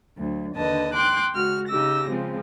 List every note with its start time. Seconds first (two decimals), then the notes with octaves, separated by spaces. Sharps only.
0.16 D2 F#3
0.55 D#2 D3 B4 D#5 A5
0.94 G5 C6 D6 F#6
1.32 C#3 G#3 F#4 F6
1.68 C#3 D#4 G4 E6 A#6
2.08 C#3 F3 G#3 C4